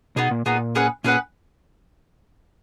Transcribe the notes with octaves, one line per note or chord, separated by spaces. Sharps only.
B2 B3 D#4 G#4
A#2
A#2 B3 D#4 G#4
C#4 G#4 B4 F#5
A#2 C#4 G#4 B4 F#5